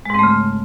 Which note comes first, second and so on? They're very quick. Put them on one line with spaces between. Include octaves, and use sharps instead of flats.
G#3 G#2 C4 A3 C#3